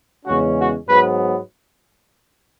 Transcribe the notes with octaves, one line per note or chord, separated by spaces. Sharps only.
E2 C#3 G#3 C#4 F#4
F#4
G#2 F#3 B3 B4